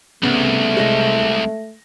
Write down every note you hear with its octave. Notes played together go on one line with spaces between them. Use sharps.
C2 C#3 A3 B3
G#3 A#6